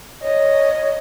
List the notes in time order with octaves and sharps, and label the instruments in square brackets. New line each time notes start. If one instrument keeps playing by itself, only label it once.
[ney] C#5 [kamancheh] D#5